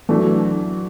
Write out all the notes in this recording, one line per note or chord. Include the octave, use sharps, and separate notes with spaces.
E3 F#3 A3 D4